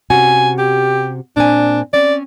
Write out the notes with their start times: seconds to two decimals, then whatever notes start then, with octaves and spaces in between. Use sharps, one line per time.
0.10 C3 C#4 F#4 G#5
0.58 G4
1.37 A#2 C4 D4 G#5
1.93 C4 C#4 D5